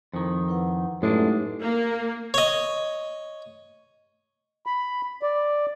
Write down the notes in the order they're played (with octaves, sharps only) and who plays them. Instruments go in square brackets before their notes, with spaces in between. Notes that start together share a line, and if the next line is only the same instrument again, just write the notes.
[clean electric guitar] F2 D#3 [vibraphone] E4
[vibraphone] E4 B4 F#5
[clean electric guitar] F#2 G#3 D4 [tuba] A2 [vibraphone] D#4 G4 B4
[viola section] A#3
[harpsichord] C#5 D#5
[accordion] B5
D5